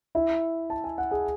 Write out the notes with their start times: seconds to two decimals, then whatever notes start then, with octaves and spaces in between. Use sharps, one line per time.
0.15 E4 E5
0.70 A5
0.84 G#5
0.98 F#5
1.11 G#4 G#5